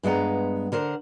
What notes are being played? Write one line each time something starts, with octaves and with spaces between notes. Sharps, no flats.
G2 G#3 B3 F#5 A#5
D3 A#4 C5 F#5